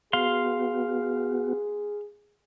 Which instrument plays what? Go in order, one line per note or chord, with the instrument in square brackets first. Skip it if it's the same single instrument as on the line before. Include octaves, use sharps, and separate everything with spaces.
[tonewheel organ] B3 F#4 [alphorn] G#4 [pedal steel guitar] F5 C6